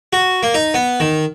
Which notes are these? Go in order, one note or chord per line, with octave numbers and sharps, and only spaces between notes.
F#4
A#3
D#4
B3
D#3